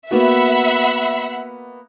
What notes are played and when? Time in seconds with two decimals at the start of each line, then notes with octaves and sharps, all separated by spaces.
0.11 A#3 B3 F#4 E5 F#5 B5